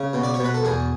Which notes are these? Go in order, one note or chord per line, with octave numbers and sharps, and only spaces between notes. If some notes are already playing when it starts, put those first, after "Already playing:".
Already playing: C#3
B2
D5
C#5
B2
B4
A4
E2 G#4